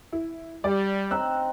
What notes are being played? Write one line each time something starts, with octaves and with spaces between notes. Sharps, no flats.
E4
G3 D5
C4 D#4 E6 F#6